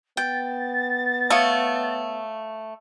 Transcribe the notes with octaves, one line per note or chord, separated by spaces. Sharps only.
B3 G5 A6
A3 C#5 F5 D#6